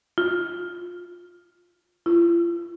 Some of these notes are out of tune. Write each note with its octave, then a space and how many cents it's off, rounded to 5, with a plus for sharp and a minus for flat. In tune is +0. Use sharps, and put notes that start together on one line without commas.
F4 +15
F4 -40